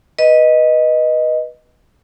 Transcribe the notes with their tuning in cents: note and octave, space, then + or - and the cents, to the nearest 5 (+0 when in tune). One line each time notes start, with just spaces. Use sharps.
B4 -15 D#5 +0